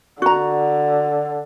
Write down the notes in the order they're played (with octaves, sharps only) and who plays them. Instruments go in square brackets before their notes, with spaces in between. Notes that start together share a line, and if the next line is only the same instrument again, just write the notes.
[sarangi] D3 [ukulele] F#4 A#5